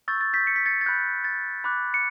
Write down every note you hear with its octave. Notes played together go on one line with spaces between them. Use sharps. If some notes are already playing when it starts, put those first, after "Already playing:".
C#6 E6 G6 A6
A6
G6 B6
C#7
B6
A6 C#7
A6
B5 F#6 G6
A6
B5 D6 F#6
C#7